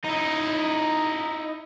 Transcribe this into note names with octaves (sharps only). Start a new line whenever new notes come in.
D#4 E4